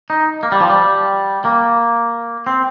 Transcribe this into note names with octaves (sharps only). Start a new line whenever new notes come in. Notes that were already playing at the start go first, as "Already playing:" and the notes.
D#4
A#3
G3
F3
G3
A#3
C4